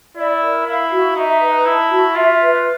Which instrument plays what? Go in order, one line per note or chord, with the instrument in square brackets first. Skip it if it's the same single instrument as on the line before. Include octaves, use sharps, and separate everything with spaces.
[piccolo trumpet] E4 [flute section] D5
[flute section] A#4
[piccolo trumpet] E4 [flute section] F5
[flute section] F#4
[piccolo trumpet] D#4 [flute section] E5
[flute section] B4
[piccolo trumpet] E4 [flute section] A5
[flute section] F#4
[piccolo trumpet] F4 [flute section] E5
[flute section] B4